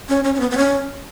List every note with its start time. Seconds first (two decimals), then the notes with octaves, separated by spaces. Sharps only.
0.09 C#4
0.24 C#4
0.34 C#4
0.40 B3
0.51 B3
0.57 C#4